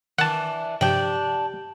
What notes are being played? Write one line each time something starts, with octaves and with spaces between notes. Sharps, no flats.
D#3 E3 D4 F#5 A5
G2 C3 F3 D4 G4 G5 G6 F#7